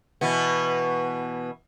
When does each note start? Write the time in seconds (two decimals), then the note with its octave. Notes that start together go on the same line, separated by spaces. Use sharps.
0.21 B2 E3 B3